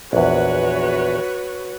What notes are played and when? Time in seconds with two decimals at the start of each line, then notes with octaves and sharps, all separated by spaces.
0.13 A#1 E2 F#4 B4 C#5